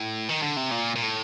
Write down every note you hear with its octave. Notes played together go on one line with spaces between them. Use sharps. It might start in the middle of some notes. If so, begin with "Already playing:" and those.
Already playing: A2
D#3
D3
C3
A#2
A#2
A2